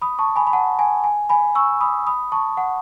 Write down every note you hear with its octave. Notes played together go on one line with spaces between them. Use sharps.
B5 D#6
A5 C#6
G#5 B5
B5
F#5 A5
G#5
G#5
G#5 B5
C#6 E6
B5 D#6
B5 D#6
A5 C#6
F#5